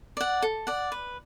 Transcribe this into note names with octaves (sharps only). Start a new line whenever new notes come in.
D5 F#5
A4
D5 F#5
B4